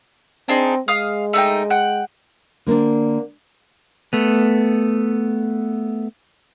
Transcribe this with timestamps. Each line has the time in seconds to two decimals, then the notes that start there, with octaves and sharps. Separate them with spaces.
0.48 C4 D4 D#4 G#4
0.88 G#3 F5 D#6 F6
1.33 A3 D#4 G5
1.70 F#5 G5
2.66 D3 A#3 C4 D4
4.13 A3 B3